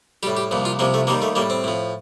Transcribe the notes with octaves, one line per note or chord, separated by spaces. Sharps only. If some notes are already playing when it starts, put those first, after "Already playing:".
A2 G3 G4
G4
C2 A#2 F3
F4
C2 C3 F3 A#3
A3
D#2 D#3 G3 A#3
A3
A2 G3 A#3
C4
A2 F3